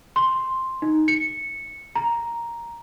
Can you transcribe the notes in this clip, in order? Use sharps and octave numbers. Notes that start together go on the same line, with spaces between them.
C6
D#4
C#7
A#5